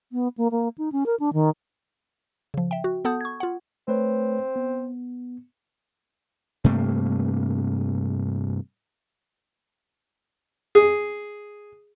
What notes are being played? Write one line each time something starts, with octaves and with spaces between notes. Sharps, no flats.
B3
A#3
A#3
D#4
C#4
A#4
D4
D#3
C#3 F3
E5 G5
F#4
B3 A4 F#5 A5 D#6 G6
C#6 G#6
F4 F#5
A3 C4 B4 C#5
B3
G2 C3 A3 A#3
G#4